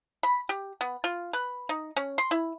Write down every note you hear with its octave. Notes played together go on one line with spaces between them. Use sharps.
B5
G4
B3
F4
B4
D#4
C#4
C6
E4